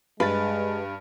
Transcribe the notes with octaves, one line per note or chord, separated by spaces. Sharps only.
G2 G#3 B4 A6